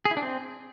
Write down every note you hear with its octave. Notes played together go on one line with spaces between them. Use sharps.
G#4
E4
D4
C4